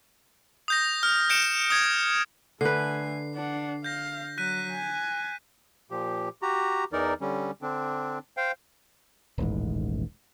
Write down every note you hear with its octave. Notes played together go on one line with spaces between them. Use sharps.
D#6 G6 A#6
F6
G6 C#7 D7 E7
D#6 G#6
D3 A3 B4 G#5 C7
D4 F#5
F5 G6 A#6
F#3 F#6 B6 D#7
G#5
A#2 F3 G4
F#4 G4 A#5
E2 E3 D#4 A#4 D5
D3 G3 C#4
D3 C4 D4
C5 F5 G5
D#1 A1 G#2